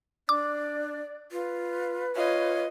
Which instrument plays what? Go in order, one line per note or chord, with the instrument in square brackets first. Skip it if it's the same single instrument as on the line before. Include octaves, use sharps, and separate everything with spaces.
[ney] D4 [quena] D5 [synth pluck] D6
[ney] F4 [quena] B4
[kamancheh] F4 D#5 [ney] C#5